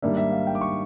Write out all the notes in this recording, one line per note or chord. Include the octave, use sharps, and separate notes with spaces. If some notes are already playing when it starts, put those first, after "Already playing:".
G#2 D#3 G3 A#3 D4 E5
E5
F5
G5
D6
C#6